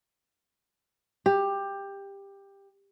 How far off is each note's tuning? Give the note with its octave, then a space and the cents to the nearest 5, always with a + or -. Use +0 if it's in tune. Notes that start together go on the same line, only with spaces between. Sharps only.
G4 +15